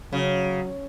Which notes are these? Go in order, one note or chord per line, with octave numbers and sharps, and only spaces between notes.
C#3 F#3